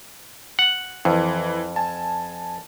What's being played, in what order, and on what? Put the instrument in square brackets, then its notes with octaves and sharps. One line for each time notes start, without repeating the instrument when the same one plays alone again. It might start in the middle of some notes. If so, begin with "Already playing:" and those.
[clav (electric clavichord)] F#5
[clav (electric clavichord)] F2 [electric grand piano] E3
[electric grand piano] G#5 A5